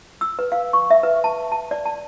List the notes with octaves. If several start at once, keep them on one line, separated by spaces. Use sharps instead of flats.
E6
B4
F5
C#6
E5
B4
A5
A5
D5
A5